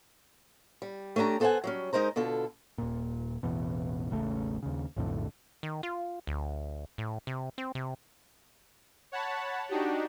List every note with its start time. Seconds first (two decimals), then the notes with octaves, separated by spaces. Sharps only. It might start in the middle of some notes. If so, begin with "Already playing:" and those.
0.82 G3
1.16 A3 C#4 D4 G4 A#5
1.40 B3 A4 C5 E5 F#5 G#5
1.64 F#3 G3 C#4
1.93 G#3 D#4 A#4 C5 A#5
2.16 B2 D3 F4 A4
2.78 D#1 A#2
3.43 A1 E2 B2
4.10 E1 A1 C#3 A3
4.63 D#2 C#3
4.96 B1 F2 A2 D3
5.63 D#3
5.83 F4
6.27 D2
6.98 A2
7.27 C3
7.58 C4
7.75 C3
9.12 C#5 F#5 A5 B5
9.69 D4 D#4 F#4 G4